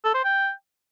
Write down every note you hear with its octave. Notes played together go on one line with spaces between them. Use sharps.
A4
C5
G5